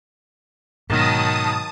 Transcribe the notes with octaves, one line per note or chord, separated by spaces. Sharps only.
G#2 B2 D#3 F#3 A5 D#6